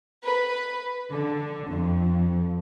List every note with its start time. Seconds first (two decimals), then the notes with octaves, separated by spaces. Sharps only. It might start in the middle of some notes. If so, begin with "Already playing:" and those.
0.25 B4
1.11 D3
1.68 F2